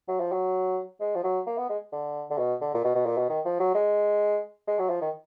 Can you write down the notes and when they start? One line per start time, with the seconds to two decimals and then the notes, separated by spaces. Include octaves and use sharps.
0.08 F#3
0.20 F3
0.32 F#3
1.00 G#3
1.15 F3
1.24 F#3
1.47 A#3
1.58 B3
1.69 G#3
1.92 D3
2.30 D3
2.38 B2
2.61 D3
2.74 A#2
2.84 B2
2.95 B2
3.06 A#2
3.17 B2
3.29 D#3
3.45 F3
3.60 F#3
3.75 G#3
4.67 G#3
4.79 F#3
4.90 F3
5.02 D#3